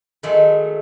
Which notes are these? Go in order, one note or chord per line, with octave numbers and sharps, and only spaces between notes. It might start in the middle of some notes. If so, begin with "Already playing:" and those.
D#3 F#3 G#3 A3